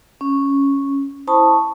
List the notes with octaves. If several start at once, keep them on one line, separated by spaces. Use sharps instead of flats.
C#4
E4 C5 A5 B5 C#6 D#6